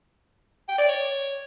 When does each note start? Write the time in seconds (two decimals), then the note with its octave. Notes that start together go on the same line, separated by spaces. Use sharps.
0.68 G5
0.79 D5
0.89 C#5